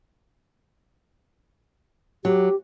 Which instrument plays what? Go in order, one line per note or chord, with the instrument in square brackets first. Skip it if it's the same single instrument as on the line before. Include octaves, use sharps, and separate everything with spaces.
[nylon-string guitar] F#3 [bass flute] G4